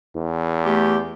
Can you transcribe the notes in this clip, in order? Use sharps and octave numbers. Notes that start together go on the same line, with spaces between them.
E2
A3 G4